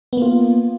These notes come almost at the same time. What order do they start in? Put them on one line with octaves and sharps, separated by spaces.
B3 A#3 F4